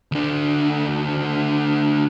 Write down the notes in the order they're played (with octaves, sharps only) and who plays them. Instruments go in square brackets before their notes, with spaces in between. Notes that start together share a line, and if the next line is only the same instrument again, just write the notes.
[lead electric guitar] D2 D4